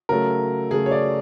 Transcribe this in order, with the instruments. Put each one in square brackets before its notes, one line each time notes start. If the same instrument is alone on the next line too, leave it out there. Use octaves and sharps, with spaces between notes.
[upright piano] C#3 F#3 A3 A#4
C#3 F#3 A3 G#4
C#5
D5